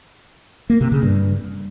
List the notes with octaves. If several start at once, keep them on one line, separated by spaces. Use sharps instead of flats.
A#3
C3
C#3
G2